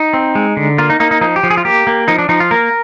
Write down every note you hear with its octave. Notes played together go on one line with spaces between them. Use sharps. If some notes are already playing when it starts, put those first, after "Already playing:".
Already playing: D#4
C4
G#3
D3
A#3 F4
D#4
A#3 D#4
D#4
F3 D#4
G4
F3
G#4
F4
A#3 G4
A#3
F3 D#4
D4
F3 D#4
F4
A#3 A#4